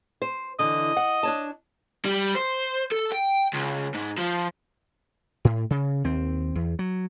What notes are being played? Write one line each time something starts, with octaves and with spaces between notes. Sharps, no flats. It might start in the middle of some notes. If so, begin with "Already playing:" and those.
C5
D3 E3 D#5
F#5
D4 C#5 A5
G3
C5
A4
G5
C#2
G#2
F3
A2
C#3
D#2 C4
E2
F#3